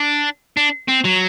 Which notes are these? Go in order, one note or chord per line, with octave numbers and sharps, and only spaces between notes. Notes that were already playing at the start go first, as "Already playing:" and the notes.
Already playing: D4
D4
C4
F#3